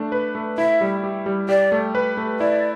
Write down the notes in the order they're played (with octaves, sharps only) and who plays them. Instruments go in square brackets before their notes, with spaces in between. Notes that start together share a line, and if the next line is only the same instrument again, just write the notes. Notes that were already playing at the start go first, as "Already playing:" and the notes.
Already playing: [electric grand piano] A3 D4
B4
A3
[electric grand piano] E4 [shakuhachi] E5
[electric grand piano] G3
G4
G3
[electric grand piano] G4 [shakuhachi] D5
[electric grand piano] A3
B4
A3
[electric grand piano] E4 [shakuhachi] D5